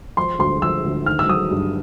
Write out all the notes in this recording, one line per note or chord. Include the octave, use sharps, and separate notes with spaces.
F3 C6
D2 C6
F3 E6
D2
D#3 F6
E6
F#3 D#6
G2